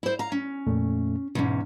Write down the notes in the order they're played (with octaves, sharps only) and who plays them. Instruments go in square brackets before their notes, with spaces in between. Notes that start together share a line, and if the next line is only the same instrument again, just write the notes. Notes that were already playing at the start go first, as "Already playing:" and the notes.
[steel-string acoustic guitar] E4 C5
F5 A#5
C#4
[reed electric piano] F2 A#2 A3
[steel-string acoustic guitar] E2 G#2 C#4 [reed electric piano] B2